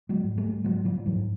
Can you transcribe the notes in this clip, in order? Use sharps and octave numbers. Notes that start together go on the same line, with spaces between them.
F#3 G#3
G#2
G3 A3
G#2 F#3 G#3
F3 G3
G#2 E3 F#3